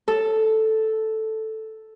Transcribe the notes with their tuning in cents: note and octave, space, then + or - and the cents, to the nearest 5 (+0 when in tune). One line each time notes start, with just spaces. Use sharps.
A4 +0